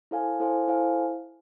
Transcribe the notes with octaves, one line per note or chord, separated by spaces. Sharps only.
E4 A4 C5 F5 G#5
E4 A4 C5 F5 G#5
E4 A4 C5 F5 G#5